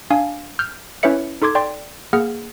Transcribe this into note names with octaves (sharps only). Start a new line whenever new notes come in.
D4 F5 G#5
F6 G6
C#4 E4 B4 C#5 E5 C#7
D#4 A4 C6 D6 G#6
D5 G5 C6
A#3 G#4 F#5 F6